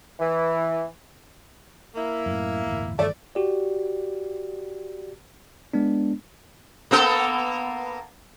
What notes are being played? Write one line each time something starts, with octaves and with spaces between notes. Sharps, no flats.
E3
A#3 E4
F#2 A2
G1 E2 A2
G2 D#3 E3 A3 D5
F#4 G4 D5
G#3 B3 D4
A#3 B3 A4